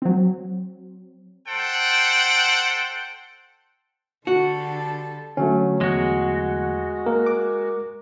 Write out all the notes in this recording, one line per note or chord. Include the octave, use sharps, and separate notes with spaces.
F#3 C4
A4 C5 F#5 G5
D3 G3 F#4 A4
D3 F#3 A3 C#4
E2 G#3 F#4
A#3 A#4
D6